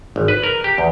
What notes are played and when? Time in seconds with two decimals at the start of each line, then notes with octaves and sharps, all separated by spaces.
0.16 G#1
0.28 B4
0.43 A#4
0.64 G4
0.78 E2